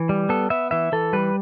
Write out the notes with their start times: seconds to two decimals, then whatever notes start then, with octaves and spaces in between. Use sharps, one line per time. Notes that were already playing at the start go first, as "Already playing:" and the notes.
Already playing: E3
0.09 G3
0.29 B3 A4
0.50 B3 E5
0.71 E3 E5
0.92 E3 A4
1.13 G3 B4